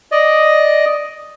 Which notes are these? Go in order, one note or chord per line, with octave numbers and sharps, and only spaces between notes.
D5 D#5